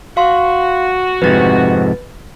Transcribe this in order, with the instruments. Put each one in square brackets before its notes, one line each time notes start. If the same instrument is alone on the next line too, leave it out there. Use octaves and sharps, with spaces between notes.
[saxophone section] F#4 [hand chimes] F5 C6
[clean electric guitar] F2 G#2 C3 [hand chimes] B4 A6